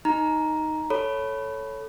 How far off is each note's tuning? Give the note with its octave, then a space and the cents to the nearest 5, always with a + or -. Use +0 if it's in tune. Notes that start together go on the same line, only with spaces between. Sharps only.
D#4 +0 A#5 +5
A4 +0 C#5 +0 B5 +0